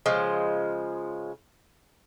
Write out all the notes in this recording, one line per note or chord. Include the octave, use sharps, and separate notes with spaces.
C#3 F3 G#3